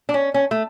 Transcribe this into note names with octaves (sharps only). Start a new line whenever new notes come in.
D4
C#4
C#4
A3